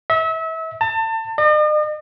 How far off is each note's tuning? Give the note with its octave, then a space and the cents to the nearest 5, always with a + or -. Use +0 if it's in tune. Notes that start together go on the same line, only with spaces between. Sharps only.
E5 -30
A5 +30
D#5 -45